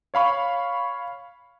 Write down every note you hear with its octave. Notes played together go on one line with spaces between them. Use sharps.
C#5 F5 B5 C#6